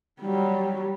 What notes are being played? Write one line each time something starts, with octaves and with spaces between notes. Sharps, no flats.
F#3 G3